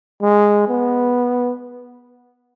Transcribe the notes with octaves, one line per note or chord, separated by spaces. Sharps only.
G#3
B3